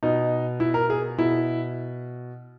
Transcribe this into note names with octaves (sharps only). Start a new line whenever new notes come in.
B2 D#4
E4
A#4
G#4
B2 E4